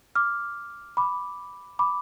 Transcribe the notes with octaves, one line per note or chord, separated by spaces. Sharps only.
D6 F6
B5 D6
B5 D6